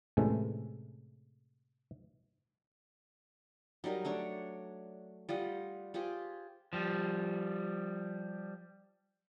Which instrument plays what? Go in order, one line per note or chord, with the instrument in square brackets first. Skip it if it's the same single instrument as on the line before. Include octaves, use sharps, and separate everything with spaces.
[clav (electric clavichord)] A2 C3 E3 G#3 A3 C#4
[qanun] F#3 G3 D#4 A#4
A3 D4 C#5
G3 F4 D#5 F#5
F4 G4 G#4 C5
[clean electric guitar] F3 G3